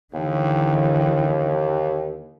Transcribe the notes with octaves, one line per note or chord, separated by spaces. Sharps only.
D#2 D3 E3